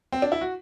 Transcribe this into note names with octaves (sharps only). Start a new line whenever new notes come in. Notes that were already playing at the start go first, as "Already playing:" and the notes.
C4
D4
E4
F#4